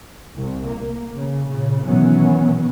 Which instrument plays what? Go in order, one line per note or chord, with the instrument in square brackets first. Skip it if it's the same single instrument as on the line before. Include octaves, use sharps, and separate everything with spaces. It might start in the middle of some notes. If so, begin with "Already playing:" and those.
[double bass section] C2
A#3
C#3
A#2 C#3
B2 D#3 E3 F#3 B3 C#4